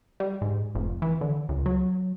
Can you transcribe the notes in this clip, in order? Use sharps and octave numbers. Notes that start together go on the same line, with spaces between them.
G3
G#2
F1
E3
D3
C#2
F#3